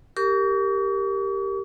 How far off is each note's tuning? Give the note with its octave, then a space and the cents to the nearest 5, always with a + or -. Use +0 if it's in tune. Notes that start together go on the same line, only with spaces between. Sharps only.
G4 +0 A#4 -15 C#6 +45